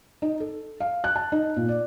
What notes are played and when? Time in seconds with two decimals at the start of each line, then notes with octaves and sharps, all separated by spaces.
0.22 D#4
0.40 A4
0.80 F5
1.04 F#6
1.16 A5
1.32 D#4
1.56 A#2
1.68 D5